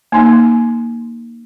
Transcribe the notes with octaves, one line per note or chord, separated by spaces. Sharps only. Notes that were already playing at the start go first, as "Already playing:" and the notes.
A#3 D#4 C6